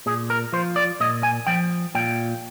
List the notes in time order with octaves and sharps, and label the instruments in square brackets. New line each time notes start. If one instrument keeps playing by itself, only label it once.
[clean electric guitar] A#2 G#4
A#4
F3 C5
D5
A#2 D#5
G#5
F3 G5
A#2 G5